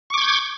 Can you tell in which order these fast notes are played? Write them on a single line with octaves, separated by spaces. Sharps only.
C#6 D6 G#6 G6